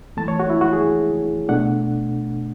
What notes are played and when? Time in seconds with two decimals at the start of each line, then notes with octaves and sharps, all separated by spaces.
0.17 F#2 E3 A3 A5
0.28 C#5
0.40 F#4
0.50 E4
0.61 F#4
0.73 G#4
1.49 B2 A3 D4 F#5